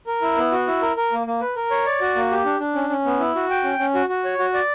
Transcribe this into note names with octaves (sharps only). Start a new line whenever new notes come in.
A#4
E4
B3
F#4
E4
A#4
A#4
A#3
A#3
B4
A#4
C#5
D5
F#4
A#3
G4
D4
D4
C#4
C#4
B3
E4
F#4
G5
C#4
C#4
F#4
F#4
C#5
F#4
D5